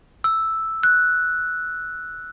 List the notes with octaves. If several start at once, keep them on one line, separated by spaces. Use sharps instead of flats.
E6
F#6